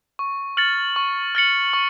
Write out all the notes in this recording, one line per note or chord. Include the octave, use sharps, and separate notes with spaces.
C#6
F6 A6 C#7 F#7
C#6
F6 A6 C#7 F#7
C#6